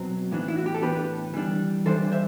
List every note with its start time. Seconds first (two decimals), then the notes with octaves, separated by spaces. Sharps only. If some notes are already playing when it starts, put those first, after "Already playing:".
Already playing: B2 F#3 C4
0.31 A2 E3 B3 D4
0.48 E4
0.57 F#4
0.66 G4
0.74 A4
0.82 A2 E3 B3 D4 G4 B4
1.34 E3 G3 D4
1.86 E3 G3 D4 A4 C5
2.12 C5 E5